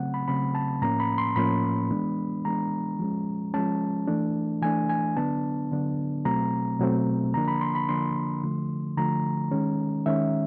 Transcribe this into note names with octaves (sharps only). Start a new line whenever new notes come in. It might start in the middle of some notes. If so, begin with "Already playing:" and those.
Already playing: C#3 F#3 A3 C4 F#5
B5
C#3 F#3 A3 C4 B5
A5
A2 F3 A#3 C#4 A#5
B5
C6
A2 F3 A#3 C#4 B5
E3 G#3 B3 D4
E3 G#3 B3 D4 A#5
F3 G#3 C#4
F3 G#3 C#4 A5
E3 A3 D4
E3 A3 D4 G#5
G#5
D3 F#3 B3 D4 A5
D3 F#3 B3 D4
B2 F#3 A3 C4 A#5
B2 F#3 A3 C4
D3 F3 A#3 D4 A#5
B5
C6
B5
D3 F3 A#3 D4 C6
D3 F3 A3
D3 F3 A3 A#5
D#3 G#3 C#4
D#3 G#3 C#4 E5